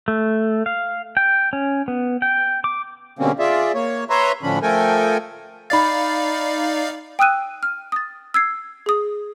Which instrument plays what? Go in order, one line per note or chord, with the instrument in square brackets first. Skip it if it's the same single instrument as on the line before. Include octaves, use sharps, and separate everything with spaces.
[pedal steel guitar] A3
F5
G5
C#4
B3
G5
D6
[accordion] B2 D3 G3 A#3 C4 C#4
F4 G#4 D5 E5
A#3 C#5
B4 C#5 E5 A#5 C6
A2 D3 F3 C#4 D4 B5
F3 A3 A4 A#4 G5 G#5
[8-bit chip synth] D#4 D5 F5 [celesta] B5 A6
[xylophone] G5 D#6 E6 F#6 D#7
F6
D#6 A6
E6 G#6 C7
G#4 D#6